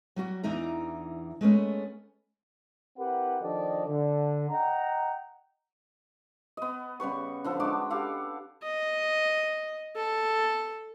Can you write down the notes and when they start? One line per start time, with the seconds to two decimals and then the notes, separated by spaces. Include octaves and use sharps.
0.16 F#3 G3 F#4
0.43 E2 E3 D4 D#4 A#5
1.41 G#3 A3 B3 C#4
2.97 C4 E4 G4 A#4 B4 F#5
3.42 D#3 F3 D4 A4 D5 D#5
3.87 D3
4.50 D#5 F#5 G5 A#5
6.57 B3 D#5
7.00 C#3 G3 B4 C#6
7.44 D3 F3 B3 A4
7.60 G#3 D4 F#4 D6
7.90 G4 A4 F5 F#5
8.63 D#5
9.96 A4